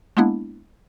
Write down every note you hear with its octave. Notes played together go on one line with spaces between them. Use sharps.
G#3 A#3 B3 D4 E4